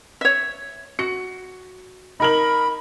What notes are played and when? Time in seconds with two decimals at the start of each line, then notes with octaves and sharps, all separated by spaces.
0.21 C#5 E5
0.99 F#4 C#7
2.20 D#4 A#4 B5 F#7